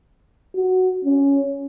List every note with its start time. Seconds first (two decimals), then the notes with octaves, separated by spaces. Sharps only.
0.55 F#4
1.05 C#4